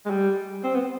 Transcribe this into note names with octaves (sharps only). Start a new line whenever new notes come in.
G#3
G3
C4
B3